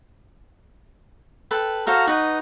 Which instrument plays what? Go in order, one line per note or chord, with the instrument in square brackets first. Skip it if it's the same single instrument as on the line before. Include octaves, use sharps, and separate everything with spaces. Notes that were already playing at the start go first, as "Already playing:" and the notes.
[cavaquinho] A4 B4 G5
[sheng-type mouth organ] F#4 A#5 F6 [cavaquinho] A4 C5 F5
[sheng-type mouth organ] D#4 [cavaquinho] F#4 B4